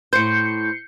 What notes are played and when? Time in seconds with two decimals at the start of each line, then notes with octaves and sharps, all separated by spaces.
0.13 A2 C5 G6 C7 C#7